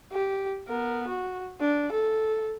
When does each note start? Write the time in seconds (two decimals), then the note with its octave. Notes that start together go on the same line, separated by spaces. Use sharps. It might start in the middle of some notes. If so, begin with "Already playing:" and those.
0.12 G4
0.68 B3 A#4
1.08 F#4
1.60 D4
1.92 A4